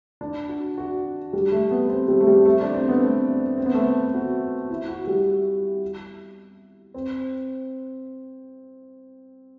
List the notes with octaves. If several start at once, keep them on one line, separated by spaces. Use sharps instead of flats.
D4
F#4
F#4
G3
A3
B3
C4
G3
A3
G3
A3
D4
C4
B3
A3
C4
B3
A3
B3
F#4
E4
F#4
G3
C4